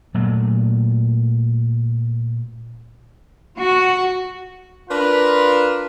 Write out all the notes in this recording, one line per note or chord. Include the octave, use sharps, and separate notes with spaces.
A#2 F#3 A3
F#4
D4 F4 A#4 B4